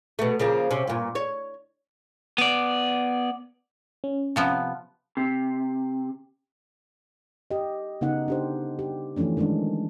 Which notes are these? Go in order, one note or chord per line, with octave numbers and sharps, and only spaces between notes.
B2 A3
C#3 F3 A#3
C3 C#4
G2 A#2
C#5
B3 D5
C#4
C3 F3 B3
C3
G4 D#5
C#3 B3 D#4 F#5
D4 G4 C5
G4
E3 F3 A3 C#4 D4
D#3 G#3 C#4 D4